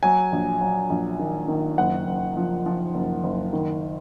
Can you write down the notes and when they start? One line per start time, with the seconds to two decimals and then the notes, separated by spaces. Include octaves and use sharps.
0.03 F#3 G#5
0.32 A#1
0.61 F#3
0.90 A#1
1.19 D#3
1.48 D#3
1.78 F#1 F#5
2.07 F#1
2.37 F3
2.66 F3
2.95 F#1
3.24 F#1
3.53 D#3